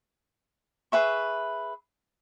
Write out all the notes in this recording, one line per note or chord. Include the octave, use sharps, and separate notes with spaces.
G#4 B4 E5 C#6